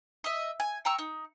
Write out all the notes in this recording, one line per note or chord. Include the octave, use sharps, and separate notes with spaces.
D#5 E5
G#5
G5 A#5 C#6 E6
D#4